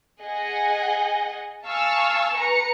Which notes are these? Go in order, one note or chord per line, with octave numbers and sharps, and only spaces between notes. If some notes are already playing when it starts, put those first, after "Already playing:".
G#4 D#5 F#5 G#5
F5 G#5 A5 C#6 E6
B4 A#5 C#7